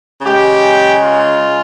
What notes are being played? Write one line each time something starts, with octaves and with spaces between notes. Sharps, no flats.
C#3 G#3 G4
F4